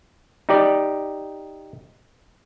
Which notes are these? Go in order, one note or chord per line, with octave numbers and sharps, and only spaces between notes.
D#4 G4 D5